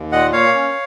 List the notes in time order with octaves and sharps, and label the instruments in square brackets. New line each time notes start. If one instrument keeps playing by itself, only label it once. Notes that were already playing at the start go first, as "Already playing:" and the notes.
Already playing: [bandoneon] D#2
A#2 D#5 F#5
A#3 C#5 F5
C#4